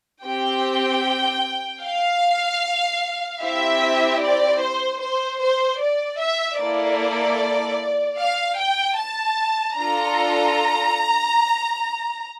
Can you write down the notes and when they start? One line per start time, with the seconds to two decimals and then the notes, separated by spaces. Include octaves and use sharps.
0.24 C4 G4 G5
1.83 F5
3.41 C4 E4 G4 E5
4.21 D5
4.60 C5
5.01 C5
5.41 C5
5.81 D5
6.20 E5
6.60 A#3 E4 A4 D5
8.18 F5
8.58 G5
8.98 A5
9.77 D4 F4 A4 A#5